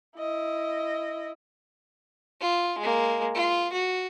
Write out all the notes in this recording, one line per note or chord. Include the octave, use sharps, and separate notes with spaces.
E4 D#5
F4
G#3 A#3
F4
F#4